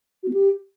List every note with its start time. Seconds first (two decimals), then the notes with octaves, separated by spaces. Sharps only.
0.23 F#4
0.28 B3
0.33 G4